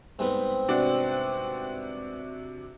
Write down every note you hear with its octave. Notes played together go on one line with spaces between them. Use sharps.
G#2 G3 B3 C4
C3 D4 F#4